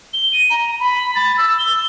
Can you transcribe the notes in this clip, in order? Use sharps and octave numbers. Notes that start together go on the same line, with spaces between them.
G7
D#7
A#5
B5
A6
E6
G7